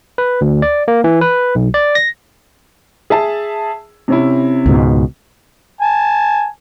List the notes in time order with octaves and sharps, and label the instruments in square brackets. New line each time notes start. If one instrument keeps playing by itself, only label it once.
[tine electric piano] B4
D2
D5
A#3
E3
B4
B1
D5
A#6
[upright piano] G#4 E5 A5
C3 C#4 E4
[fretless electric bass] C#2 G#2 B2
[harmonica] G#5 A5